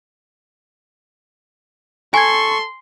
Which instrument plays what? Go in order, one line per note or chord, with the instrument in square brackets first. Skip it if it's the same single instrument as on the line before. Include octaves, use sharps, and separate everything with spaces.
[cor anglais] A4 [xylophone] G#5 G#6 [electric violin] C6 [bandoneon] C#6